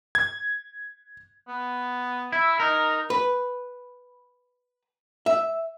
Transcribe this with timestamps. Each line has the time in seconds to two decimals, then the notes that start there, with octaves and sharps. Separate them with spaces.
0.15 G#6
1.48 B3
2.33 E4 E5
2.60 D#4 A#4
3.10 B4
5.26 E5